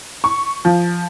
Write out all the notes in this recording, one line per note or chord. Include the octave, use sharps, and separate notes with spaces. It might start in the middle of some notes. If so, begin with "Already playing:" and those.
C#6
F3